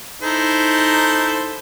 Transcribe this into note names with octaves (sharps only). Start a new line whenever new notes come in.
D#4 E4 A4 C5